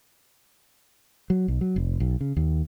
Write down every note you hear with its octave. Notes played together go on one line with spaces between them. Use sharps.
F#3
B1
F#3
F1
B1
C#3
D#2